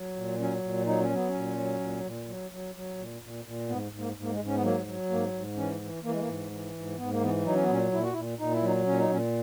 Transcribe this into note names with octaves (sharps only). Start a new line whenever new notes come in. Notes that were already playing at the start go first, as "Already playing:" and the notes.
Already playing: F#3
A#2
F#3 C#4
A#2
F#3 D#4
C#4
F#3 B3
C#4
A#2
F#3
A#2
A#2
F#3
F#3
F#3
A#2
A#2
A#2
G#2 B3
G#2
A#3
G#2
A#3
G#3
G#2
C#4
B3
F#3 A#3
F#3
G#2 A#3
G#2
E3 C#4
E3
E3 A#3
G#3
A#3
G#2
E3
G#2
G#2 B3
A#3
E3 B3
F#3 D#4
C#4
B3
A#2 C#4
A#2 E4
F#4
A#2 E4
A#2 D#4
E4
F#3 D#4
A#2 C#4
D#4
A#2 C#4